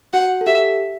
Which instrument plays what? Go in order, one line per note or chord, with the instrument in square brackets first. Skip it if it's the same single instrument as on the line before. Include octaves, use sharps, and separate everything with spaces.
[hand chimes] F#4 [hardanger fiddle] F#5
[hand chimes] A4
[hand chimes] G4 [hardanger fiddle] E5